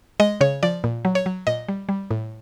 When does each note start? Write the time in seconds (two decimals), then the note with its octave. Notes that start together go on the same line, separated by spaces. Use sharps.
0.20 G#3 D#5
0.41 C#3 C#5
0.63 F3 D5
0.84 A#2
1.05 F#3
1.15 C#5
1.26 F#3
1.47 A#2 D#5
1.69 G3
1.89 G3
2.11 A2